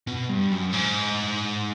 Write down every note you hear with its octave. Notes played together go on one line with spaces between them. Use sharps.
B2
G2
F#2
G#2